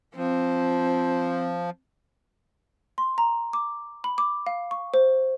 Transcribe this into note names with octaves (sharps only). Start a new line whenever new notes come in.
F3 C4
C6
A#5
D6
B5
D6
F5
C#6
C5